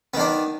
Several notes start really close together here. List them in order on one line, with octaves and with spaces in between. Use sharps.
B3 D#3 D4